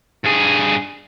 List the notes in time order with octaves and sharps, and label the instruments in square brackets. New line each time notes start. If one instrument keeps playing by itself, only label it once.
[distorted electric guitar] G2 G#4